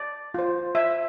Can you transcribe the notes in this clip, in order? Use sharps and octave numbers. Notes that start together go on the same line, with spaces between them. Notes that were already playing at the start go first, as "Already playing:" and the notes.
Already playing: D5
F4 C5
E5